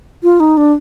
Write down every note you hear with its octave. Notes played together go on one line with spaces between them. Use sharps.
F4
D#4
D4